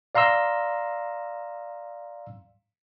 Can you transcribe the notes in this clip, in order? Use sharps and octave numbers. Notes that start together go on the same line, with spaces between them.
D5 F5 A#5 C6 E6